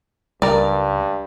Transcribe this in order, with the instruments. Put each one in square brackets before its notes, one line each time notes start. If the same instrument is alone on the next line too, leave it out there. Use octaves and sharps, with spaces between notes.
[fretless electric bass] C#2 [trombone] G2 [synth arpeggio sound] G3 A#4 [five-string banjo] D5